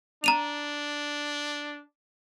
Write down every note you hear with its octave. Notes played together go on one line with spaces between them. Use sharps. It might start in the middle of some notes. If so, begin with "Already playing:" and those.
D4 A#5 D#7 F7